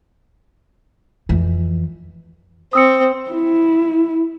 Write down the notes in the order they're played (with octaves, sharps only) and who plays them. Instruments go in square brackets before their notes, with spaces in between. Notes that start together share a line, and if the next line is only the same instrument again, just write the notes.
[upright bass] F2 E3
[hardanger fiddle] C4 [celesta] D#6 E6 C#7
[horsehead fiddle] E4